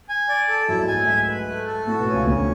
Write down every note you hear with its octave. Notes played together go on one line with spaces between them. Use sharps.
G#5
D5
A4
F#2 F#3 E4
G#2 G#3
G#5
F#2 F#3
A3
G#2 G#3 E5
B4
A3
A4
A2 A3 F#4
B2 B3
C#4
C#2 C#3
D2 D3 C#4